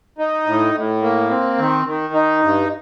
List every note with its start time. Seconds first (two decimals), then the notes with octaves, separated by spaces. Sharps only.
0.18 D#4
0.46 A2
0.74 A2
1.02 A#3
1.30 C4
1.59 D#3
1.86 D#3
2.13 D#4
2.42 G2